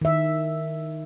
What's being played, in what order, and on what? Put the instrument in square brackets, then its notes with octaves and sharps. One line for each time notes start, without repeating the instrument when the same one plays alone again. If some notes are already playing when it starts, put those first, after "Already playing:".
[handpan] D#3 E5